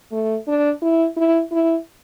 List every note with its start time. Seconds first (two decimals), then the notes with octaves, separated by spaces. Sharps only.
0.12 A3
0.48 D4
0.82 E4
1.16 E4
1.52 E4